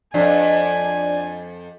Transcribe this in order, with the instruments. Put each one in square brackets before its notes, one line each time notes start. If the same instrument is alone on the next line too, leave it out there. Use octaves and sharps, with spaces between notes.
[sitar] F2 [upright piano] D4 [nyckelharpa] G#5